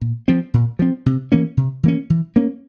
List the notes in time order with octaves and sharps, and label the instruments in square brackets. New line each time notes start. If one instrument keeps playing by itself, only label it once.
[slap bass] A#2
F3 C4
A#2
F3 C4
C3
E3 A#3 C#4
C3
E3 A#3 C#4
E3
A#3 C#4